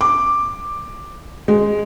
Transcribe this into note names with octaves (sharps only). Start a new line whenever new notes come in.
D6
G#3